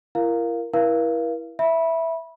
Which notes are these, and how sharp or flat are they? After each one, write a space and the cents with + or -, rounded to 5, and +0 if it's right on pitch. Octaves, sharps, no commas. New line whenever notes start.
E4 +45 A#4 +0 F5 +0
E4 +5 A#4 +45 F5 -30
E5 +0 B5 -20